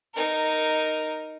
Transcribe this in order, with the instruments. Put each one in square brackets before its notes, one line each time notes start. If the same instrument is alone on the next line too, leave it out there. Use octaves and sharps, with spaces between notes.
[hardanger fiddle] D#4 [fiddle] A#4